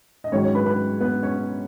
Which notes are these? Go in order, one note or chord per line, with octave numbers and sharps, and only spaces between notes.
D#5
G#2 D#3 F#3 C#4 C#5
C#4 C#5
B4 B5
B4 B5
B3 B4
C#4 C#5